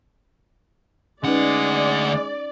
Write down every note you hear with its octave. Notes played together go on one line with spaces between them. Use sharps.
D2 G#3 C#4 D#4 B4 D5 F#5